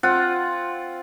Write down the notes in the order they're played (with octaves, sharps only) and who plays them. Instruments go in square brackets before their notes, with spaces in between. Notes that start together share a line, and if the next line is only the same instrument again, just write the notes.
[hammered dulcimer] C4 F4 F#5